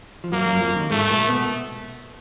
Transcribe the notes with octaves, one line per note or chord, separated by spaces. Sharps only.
F3
F#2 F#3 A#3
F#2 F#3
F2 F3
D#2 D#3
G#2 G#3 A3
A#2 A#3
B2 B3